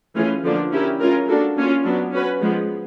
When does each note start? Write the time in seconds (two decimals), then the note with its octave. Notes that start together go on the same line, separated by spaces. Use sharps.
0.15 E3 A3 C#4 F4 G#4
0.44 D3 F3 A#3 D4
0.72 C#4 E4 G4 A#4
1.00 G#3 C#4 F4 A#4
1.28 A#3 D4 F#4 A4
1.56 A#3 C#4 F4
1.84 F#3 B3 D4
2.13 C#4 F#4 B4
2.41 F3 G#3 B3